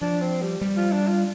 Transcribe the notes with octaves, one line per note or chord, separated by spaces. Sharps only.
F3 D4
C4
G3
G3
F4
D4
F4